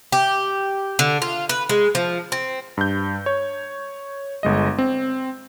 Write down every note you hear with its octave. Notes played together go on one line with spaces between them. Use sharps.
G4
D3
F4
B4
G#3
F3
C4
G2 G6
C#5
G1 G#3 D#5
C4